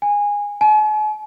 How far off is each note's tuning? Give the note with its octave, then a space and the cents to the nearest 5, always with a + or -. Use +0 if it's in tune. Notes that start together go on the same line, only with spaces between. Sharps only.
G#5 -15
G#5 +45